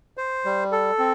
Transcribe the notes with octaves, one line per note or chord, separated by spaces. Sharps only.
C5
G3
A4
C4